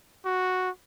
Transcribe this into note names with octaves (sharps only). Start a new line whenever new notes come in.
F#4